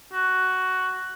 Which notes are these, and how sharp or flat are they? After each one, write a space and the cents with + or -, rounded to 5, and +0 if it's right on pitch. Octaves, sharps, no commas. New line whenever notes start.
F#4 +10